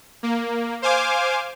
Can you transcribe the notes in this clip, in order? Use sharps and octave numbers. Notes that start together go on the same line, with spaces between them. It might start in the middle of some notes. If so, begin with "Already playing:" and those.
A#3
C5 F5 G#5 D6